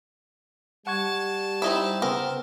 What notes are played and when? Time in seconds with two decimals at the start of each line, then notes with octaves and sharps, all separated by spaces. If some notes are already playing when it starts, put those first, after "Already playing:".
0.87 G3 F#5 A5 C#6 G#6
1.62 C4 D#4 E4
2.02 C#3 B3 C4 A#4